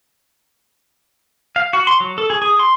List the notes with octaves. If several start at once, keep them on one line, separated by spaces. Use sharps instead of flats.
F5
F#4
C6
F#3
A4
G#4
G#4
C6